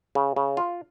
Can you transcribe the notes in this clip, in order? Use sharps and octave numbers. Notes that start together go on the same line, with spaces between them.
C#3
C#3
F4